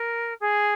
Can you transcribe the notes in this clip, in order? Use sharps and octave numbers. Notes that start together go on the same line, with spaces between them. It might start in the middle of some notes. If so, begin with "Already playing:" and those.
Already playing: A#4
G#4